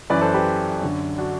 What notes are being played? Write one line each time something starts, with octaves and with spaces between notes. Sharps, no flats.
F#2 E3 B4 D5
A4 C5
G4 B4
F#2 D3
D4 F#4